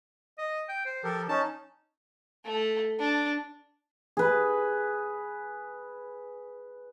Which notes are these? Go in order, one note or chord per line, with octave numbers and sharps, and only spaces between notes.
D#5
G5
C5
F3 G4 A4 A#4
C#4 D#4 A5
A3
D4
G#4 B4